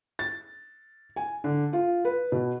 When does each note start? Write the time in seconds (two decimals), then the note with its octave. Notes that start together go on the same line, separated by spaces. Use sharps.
0.19 A6
1.16 G#5
1.44 D3
1.73 F4
2.05 B4
2.32 B2